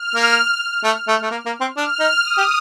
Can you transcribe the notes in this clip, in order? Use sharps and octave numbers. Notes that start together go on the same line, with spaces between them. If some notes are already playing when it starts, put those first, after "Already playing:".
Already playing: F6
A#3
A3
A3
A3
A#3
A#3
C4
D4 F6
D#4
D#6
G4